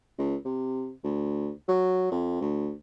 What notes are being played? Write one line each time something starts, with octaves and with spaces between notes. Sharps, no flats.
C#2
C3
D2
F#3
F2
D2